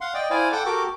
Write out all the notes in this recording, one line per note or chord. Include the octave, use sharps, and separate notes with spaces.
F5 F#5 C6
D5 D#5 G5
E4 C5 D5 F5 G#5
A4 F#5 G5 D6
F#4 G4 A4 A#4 D6